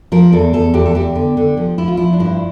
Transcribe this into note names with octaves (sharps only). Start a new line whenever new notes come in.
F3 A#4
E2 A4
E2 A4
E2 G4
A4
E2 G4
D3
D3
F3
F3 E4
F4
F3 E4
D4
G2 E4